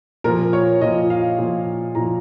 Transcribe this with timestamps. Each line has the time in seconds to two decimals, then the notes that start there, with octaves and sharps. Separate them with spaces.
0.24 A#2 F3 A#4
0.53 C#5
0.81 A#2 F3 D#5
1.10 F5
1.38 A#2 F3
1.95 A#2 F3 A#5